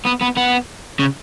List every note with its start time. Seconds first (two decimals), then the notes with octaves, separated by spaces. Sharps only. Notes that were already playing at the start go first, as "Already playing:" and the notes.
0.05 B3
0.21 B3
0.37 B3
0.99 C#3